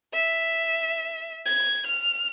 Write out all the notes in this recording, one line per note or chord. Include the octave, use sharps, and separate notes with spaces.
E5
G#6
F6